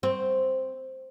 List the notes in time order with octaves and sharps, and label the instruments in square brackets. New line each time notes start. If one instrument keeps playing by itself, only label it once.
[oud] C4